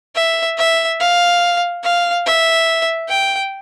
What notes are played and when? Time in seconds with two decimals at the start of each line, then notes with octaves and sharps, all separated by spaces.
0.16 E5
0.58 E5
1.00 F5
1.84 F5
2.26 E5
3.09 G5